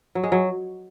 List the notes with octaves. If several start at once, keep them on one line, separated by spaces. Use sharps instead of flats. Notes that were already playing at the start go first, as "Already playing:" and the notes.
F#3
G#3
F#3